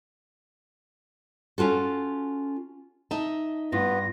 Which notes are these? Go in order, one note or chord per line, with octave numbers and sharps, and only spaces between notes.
C#4 F4 F#4 A4
D#4 D#5 E5 A5
G2 B3 F4 A#6